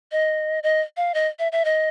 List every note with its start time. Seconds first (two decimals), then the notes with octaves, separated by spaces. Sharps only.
0.12 D#5
0.63 D#5
0.97 F5
1.14 D#5
1.39 E5
1.52 E5
1.65 D#5